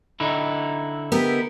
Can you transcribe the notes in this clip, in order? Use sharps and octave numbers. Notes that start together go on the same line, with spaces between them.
D3 D#4 E4
B3 G4 A#4